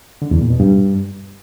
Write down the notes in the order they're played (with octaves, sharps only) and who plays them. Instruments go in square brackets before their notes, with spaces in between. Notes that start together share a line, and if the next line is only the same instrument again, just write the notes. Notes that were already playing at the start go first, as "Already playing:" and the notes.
[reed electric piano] D3
E2
A#2
B2
G2